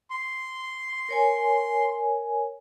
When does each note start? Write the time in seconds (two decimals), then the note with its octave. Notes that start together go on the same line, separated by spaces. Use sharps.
0.11 C6
1.09 A#4 C#5 G#5